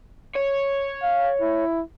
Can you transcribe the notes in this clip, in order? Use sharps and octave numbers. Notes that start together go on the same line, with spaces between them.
C#5
F5
E4